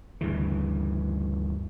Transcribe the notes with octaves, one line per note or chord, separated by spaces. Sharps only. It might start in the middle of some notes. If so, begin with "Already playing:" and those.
D2 G2 C#3 E3